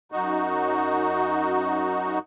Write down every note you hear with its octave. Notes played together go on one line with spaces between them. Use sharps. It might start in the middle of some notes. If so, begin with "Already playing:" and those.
F#2 D#4 F#4